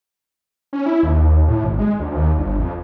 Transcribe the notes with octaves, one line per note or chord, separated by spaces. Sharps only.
C#4
E4
D#2
A2
G#1
G#3
D2
D#2
G1
F2